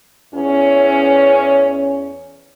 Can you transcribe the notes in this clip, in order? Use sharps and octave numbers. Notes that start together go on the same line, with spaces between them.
E2 C#4